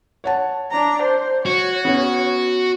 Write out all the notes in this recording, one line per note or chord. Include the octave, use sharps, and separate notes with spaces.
C#5 F#5 A5
D4 A#5
C5
F#4 C#5
B3 C#4